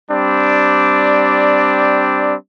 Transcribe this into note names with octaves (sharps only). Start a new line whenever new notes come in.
G3 C4 D4 D5